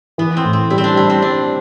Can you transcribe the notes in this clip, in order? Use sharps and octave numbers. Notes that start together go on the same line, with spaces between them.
E3 B3
C4
A2
C4
G3 E4
C4
D4
G3 E4
C4
G3 D4